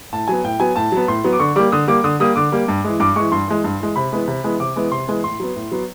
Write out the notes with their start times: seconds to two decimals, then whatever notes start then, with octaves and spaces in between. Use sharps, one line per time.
0.13 A2 A5
0.28 F#3 B3 G#5
0.44 A2 G5
0.60 F#3 B3 G#5
0.76 A2 A5
0.92 F#3 B3
1.08 A2 C6
1.24 F#3 B3
1.33 D6
1.40 D3 C#6
1.56 G3 A#3 D6
1.72 D3 D#6
1.87 G3 A#3 D6
2.04 D3 D#6
2.20 G3 A#3 D#6
2.36 D3 D6
2.52 G3 A#3
2.68 G2
2.84 E3 G#3
3.00 G2 D6
3.16 E3 G#3 C#6
3.32 G2 C6
3.48 E3 G#3
3.64 G2
3.80 E3 G#3
3.96 C3 B5
4.12 E3 G#3 B3
4.28 C3
4.44 E3 G#3 B3
4.60 C3 D6
4.76 E3 G#3 B3
4.92 C3 C6
5.07 E3 G#3 B3
5.24 A2 C6
5.40 F#3 B3
5.56 A2
5.72 F#3 B3